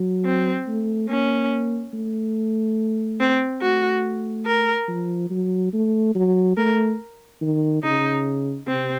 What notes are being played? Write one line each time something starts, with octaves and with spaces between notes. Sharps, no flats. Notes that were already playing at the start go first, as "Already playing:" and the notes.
Already playing: F#3
C4
A3
A#3 C#4
A3
C4
A3 F#4
A#4
F3
F#3
A3
F#3
A3 A#4
D#3
C#3 D#4
C3 C4